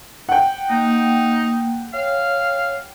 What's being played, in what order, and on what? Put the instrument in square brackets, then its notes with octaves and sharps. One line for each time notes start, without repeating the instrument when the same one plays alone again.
[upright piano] F#5 G5
[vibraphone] A#3 [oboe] D#4
[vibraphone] C#5 [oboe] F5